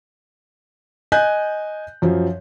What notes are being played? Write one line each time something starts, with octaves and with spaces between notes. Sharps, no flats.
D#5 G#5 F#6 G6
F#2 F3